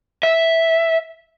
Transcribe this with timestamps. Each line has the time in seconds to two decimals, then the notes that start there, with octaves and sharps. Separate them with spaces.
0.23 E5